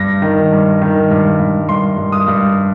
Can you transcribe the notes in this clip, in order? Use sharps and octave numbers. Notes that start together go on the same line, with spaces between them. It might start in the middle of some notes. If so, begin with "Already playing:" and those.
Already playing: G2 A#6
D#3
G2
D#3
G2
G2
G2 C6
G2
D#6
G2